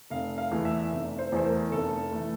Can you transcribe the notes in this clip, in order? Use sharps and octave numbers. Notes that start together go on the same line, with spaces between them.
F1 F5
F5
E2 E3 A3
E5
F1 E5
C5
E2 E3 A3 C5
A#4
F1 A4
E3 A3